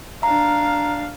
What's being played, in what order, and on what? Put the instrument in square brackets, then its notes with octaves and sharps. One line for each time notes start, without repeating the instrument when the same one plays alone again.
[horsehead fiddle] D4 F5 [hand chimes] A#5